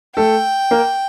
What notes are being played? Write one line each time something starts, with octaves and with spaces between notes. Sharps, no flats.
A3 A4 G5
A#3 A#4